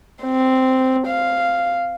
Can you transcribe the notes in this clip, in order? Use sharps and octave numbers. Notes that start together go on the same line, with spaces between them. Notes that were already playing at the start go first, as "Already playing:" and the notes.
C4
F5